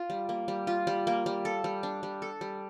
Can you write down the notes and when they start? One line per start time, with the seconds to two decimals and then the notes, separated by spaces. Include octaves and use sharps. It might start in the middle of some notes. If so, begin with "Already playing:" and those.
Already playing: F4
0.10 G3
0.29 A#3
0.48 G3
0.67 F4
0.87 G3
1.07 A#3
1.26 G3
1.45 A4
1.64 G3
1.83 D4
2.03 G3
2.22 A4
2.41 G3